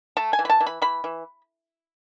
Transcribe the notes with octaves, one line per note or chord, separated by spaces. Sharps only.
A3 A5
G#5
E3
B5
A5
E3
B5
E3 B5
E3